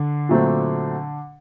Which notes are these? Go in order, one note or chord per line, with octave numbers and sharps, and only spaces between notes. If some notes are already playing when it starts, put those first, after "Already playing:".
Already playing: D3 D4
A#2 F#3 A3 C4